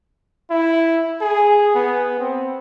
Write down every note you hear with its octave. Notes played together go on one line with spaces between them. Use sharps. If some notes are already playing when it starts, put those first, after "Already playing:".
E4
G#4
B3
C4